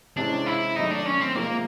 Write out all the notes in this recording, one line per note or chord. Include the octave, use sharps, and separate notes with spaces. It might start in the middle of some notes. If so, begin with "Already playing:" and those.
C3 E3 G#3 C#4 D4
E4
D#3 F#3 A3 D#4
D4
C#4
C4
C3 F3 G#3 A#3